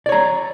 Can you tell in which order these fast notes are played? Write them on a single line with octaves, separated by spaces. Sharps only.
D5 C#5 A#5